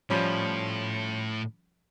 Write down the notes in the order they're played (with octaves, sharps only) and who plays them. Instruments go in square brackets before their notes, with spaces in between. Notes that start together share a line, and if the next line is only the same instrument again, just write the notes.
[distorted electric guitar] A2 [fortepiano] F3 G3 C#4